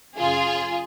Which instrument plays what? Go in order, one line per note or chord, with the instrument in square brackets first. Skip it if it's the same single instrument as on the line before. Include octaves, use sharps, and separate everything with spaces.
[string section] F#2 C#3 F4 G#4